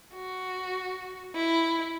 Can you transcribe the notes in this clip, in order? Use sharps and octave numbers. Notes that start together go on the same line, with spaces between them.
F#4
E4